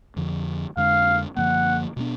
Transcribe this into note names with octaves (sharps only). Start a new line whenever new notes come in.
F2 D3 F3
F2 D3 G#3 D4 F5
F#2 D3 F3 A#3 F#5
B2 G#3 B3 D4